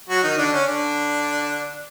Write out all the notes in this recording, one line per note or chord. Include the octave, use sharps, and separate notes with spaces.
F#3 F#4
D#3 D#4
D3 D4
C#4
D3 D4